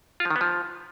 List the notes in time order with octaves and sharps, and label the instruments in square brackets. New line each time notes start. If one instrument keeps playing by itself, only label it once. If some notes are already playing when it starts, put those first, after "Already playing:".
[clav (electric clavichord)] F4
F3
D#3
B3
F3